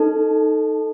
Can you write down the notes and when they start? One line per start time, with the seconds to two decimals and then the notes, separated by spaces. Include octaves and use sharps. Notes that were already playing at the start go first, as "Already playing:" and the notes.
Already playing: D#4 A4 A5